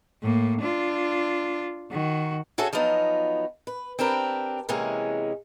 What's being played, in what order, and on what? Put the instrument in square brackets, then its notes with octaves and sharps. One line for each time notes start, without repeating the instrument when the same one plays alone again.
[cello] A2 A#3
D4 F4
D#3 F#4
[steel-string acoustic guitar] C#4 F#4 G#4 A4 C#5 E5
F3 F#3 B3 D#4 F4
B4
C4 D4 G4 A#4 B4
C3 E3 G#3 A#3 C#4 G#4